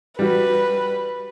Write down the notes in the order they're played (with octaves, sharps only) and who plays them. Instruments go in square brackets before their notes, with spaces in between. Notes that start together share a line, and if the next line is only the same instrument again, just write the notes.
[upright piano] G3 F#4 [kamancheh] B4